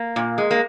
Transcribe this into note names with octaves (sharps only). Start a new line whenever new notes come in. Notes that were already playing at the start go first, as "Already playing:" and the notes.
Already playing: A#3
A#2
G#3
A#3